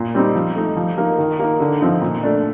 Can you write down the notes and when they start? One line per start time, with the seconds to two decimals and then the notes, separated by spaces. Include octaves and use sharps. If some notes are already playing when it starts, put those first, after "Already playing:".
Already playing: A#2
0.15 G3 C4 D#4
0.35 F3
0.55 A3 D#4
0.77 F3
0.98 A#3 D#4
1.18 D#3
1.39 A#3 D#4
1.60 D3
1.81 F3 C4 D#4
2.02 A#2
2.23 A3 D4